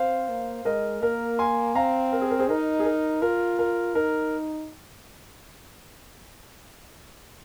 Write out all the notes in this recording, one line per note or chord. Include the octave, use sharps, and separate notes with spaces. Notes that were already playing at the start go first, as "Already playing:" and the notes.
Already playing: C4 C5 F5
A#3
G#3 A#4 D#5
A#3 A#4
G#5 C6
C4 F5 A#5
A#4
G#4
A#4
G#4 C5
D#4 A#4 D#5
G#4
A#4
F4 A#4
A#4
D#4 A#4